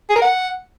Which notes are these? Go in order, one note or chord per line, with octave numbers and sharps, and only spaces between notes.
G#4
A#4
F#5